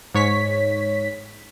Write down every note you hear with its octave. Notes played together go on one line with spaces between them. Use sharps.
G#2 C#5 B6